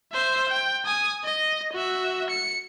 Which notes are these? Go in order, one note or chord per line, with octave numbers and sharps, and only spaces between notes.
C5 E5
G5
G#5 D#6
D#5
F#4 E5
C#7